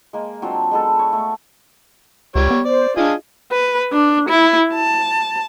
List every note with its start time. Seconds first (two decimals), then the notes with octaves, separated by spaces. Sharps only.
0.13 G#3 A#3
0.42 F#3 C4 D4 F4
0.71 G#3 B3 A4
0.99 C#5
1.13 A3
2.35 C#2 G3 C#5
2.51 B3
2.65 C5 D5
2.97 D4 F4 G#4 D#5 F5
3.52 B4
3.93 D4
4.29 E4
4.74 A5